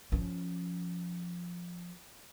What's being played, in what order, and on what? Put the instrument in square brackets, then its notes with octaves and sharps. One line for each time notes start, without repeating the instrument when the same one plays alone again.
[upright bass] F3 C#4